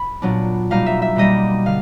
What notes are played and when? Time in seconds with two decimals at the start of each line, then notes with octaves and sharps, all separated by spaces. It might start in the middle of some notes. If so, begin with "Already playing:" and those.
Already playing: B5
0.22 A#2 F#3 B3 D4
0.70 B2 G3 A#3 D#4 F5
0.86 E5
1.02 E5
1.16 B2 G3 A#3 D#4 D#5
1.66 D3 F5